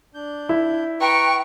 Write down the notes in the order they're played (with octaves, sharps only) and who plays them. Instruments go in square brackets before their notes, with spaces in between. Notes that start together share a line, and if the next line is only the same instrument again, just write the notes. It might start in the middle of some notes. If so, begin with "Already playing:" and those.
[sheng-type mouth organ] D4 G6
[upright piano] E4
[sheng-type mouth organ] B4 A#5 [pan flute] G5 [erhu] C#6